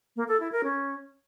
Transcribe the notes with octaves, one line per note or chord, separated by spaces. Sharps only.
A#3
A4
E4
A#4
C#4